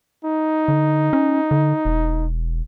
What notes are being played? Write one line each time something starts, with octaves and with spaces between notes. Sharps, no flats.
D#4
D3
C#4
D3
E1